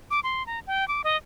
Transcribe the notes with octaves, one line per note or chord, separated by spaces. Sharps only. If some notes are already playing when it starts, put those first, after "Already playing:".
D6
C6
A#5
G5
D6
D#5